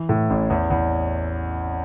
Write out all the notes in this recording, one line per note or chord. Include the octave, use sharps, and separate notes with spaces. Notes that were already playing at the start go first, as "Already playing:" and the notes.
Already playing: E3
A2
A1
E2
E2